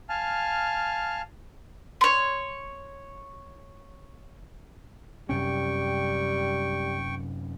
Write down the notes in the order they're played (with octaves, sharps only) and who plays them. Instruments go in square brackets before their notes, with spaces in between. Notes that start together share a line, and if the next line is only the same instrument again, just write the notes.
[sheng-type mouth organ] F5 G#5 A5 F6
[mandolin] C#5 C6
[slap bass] F#2 C3 C#4 [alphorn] G3 [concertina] G5 C#6